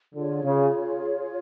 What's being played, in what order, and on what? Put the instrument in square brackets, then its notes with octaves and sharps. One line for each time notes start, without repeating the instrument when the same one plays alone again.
[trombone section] D3 [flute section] F4 G#4 C#5
[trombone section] C#3